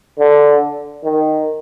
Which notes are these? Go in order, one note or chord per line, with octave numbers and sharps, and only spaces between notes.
D3
D#3